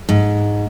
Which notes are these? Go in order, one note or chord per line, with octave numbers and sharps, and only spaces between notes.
G#2